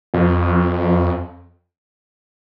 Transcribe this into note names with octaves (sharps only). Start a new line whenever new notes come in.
F2